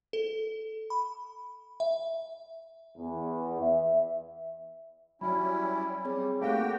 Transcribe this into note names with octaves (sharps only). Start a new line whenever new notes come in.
A4
B5
E5
E2
E5
F#3 G3 C#4 E4 B5
G3 C4 G#4 C#5
A3 A#3 F#4 G4 F5 G5